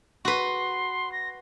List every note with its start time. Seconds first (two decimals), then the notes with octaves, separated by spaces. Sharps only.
0.25 F#4 B4 C6
1.12 A#6